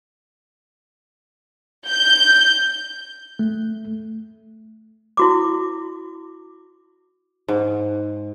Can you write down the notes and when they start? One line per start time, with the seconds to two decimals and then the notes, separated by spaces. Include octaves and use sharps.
1.88 G6
3.39 A3
5.17 E4 F#4 D6
7.48 G#2